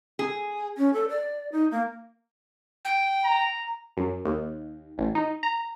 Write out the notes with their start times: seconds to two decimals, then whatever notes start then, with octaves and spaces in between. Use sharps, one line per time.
0.19 G#4
0.77 C#4
0.93 A4
1.09 D5
1.52 D#4
1.71 A#3
2.85 G5
3.24 A#5
3.97 F#2
4.25 D#2
4.98 A1
5.15 D#4
5.43 A#5